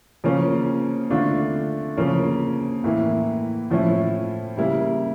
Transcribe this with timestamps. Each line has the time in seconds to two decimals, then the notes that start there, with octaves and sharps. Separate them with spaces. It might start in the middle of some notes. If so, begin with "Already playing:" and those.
0.24 C#3 F3 A#3 C#4
1.10 D3 A3 D4 F4
1.97 C#3 F3 A#3 C#4
2.84 A2 E3 A#3 E4
3.70 A2 F3 C#4 E4
4.57 C#3 G3 A#3 E4